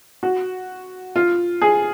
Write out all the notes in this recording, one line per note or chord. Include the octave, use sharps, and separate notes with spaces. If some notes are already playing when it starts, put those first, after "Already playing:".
F#4
F4
G#4